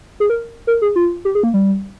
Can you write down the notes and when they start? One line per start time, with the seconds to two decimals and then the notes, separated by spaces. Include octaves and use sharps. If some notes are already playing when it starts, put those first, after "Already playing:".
0.20 G#4
0.30 A#4
0.67 A#4
0.82 G#4
0.96 F4
1.25 G4
1.35 G#4
1.43 A#3
1.54 G3